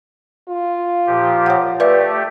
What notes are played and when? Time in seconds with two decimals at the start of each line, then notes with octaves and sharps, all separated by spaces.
0.48 F4
1.07 A#2 F3 G4
1.46 C#5 F#5
1.80 A3 G4 B4 D5 E5